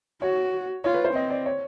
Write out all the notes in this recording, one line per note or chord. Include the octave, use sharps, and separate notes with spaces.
F#4 C#5
F4 C#5
B4
C5
C4 D#5
D5
C#5